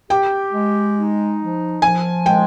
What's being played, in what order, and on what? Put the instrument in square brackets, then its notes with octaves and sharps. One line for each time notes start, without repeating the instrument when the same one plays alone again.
[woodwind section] G4 [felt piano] G5
[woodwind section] G#3
D#4
F3
[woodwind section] F3 [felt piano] G#5
[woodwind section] G#3 [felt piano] G5